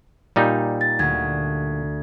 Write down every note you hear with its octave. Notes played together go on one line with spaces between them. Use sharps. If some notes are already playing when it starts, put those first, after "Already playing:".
A#2 G3 D#4
A6
D2 G#6